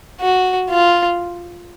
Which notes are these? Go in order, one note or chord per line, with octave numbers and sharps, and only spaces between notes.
F#4
F4